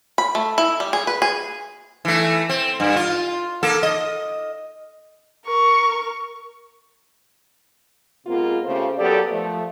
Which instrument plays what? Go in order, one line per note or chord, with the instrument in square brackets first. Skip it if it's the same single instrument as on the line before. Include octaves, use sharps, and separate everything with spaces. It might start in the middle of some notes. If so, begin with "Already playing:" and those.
[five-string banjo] B5
A3
E4
G3
G#4
B4
G#4
[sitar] E3 A3
C4
G2
F4
A#3 A4
D#5
[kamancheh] A#4 C#6
[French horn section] C3 G#3 A#3 B3 F4
C#3 A3 F4 G4 C5
F#3 A#3 B3 G4 A4 D5
F3 A3